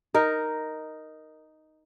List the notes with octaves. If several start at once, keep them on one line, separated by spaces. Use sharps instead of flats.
D#4 A#4